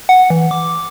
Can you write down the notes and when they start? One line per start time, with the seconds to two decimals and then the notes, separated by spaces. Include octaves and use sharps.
0.09 F#5
0.30 E3
0.51 D6